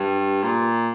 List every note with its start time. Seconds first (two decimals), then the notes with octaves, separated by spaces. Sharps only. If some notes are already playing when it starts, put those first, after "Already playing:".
Already playing: G2
0.43 A#2